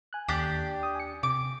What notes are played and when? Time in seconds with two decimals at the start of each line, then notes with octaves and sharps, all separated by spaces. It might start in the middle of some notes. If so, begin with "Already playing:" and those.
0.13 G#5 F#6
0.29 D#2 D4 G4 G5 A6
0.83 D#6
0.95 G#5 C#7
1.23 C3 D6